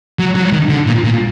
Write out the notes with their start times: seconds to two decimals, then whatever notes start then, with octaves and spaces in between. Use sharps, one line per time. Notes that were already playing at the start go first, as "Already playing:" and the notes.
0.19 F#3
0.35 F#3
0.52 D#3
0.69 D3
0.87 A#2
1.04 A#2